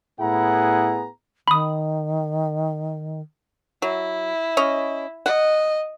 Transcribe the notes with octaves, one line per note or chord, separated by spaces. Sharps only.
A2 B3 E4 G#4 F#5 A#5
D#3 B5 D#6
F#3 E4
C#4 C#5 D#5
D#5 F#5